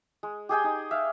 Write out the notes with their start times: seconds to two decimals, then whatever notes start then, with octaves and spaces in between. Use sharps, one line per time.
0.23 G#3
0.49 G4 G#4 G5 G#5
0.64 D#4
0.91 E5 F5